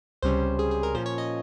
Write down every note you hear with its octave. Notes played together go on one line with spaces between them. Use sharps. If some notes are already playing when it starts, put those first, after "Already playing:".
C#2 C3 G3 C#4 C5
G#4
G#4
A#4
A#2 F3 A#3 C#4 C5
C#5
D#5